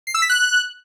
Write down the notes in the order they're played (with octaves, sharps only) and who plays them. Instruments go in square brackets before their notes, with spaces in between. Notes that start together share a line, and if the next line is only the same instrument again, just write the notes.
[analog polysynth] C7
E6
B6
F#6